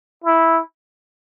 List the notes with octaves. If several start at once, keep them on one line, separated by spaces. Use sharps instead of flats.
E4